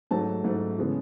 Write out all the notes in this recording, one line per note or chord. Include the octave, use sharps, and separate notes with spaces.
G#2 F#3 A3 A5
G#2 F#3 A3
C#3 E3 G#3 B3